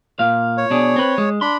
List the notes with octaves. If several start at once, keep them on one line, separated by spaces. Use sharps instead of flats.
A#2 F5
C#5
B2 D4 G#4
C4 B4
G#3
D4 B5 C6